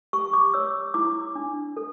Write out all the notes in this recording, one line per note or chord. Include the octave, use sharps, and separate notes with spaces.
G4 C#6
D6
C#5 E6
E4 D6
D4
A4